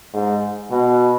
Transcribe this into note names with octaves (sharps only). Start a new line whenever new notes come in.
G#2
B2